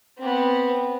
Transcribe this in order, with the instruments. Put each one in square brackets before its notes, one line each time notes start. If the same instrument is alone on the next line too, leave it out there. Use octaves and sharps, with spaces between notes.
[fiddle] B3 C4